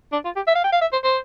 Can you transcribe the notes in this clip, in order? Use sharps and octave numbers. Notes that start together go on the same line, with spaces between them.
D4
F4
G4
E5
F5
G5
F5
E5
C5
C5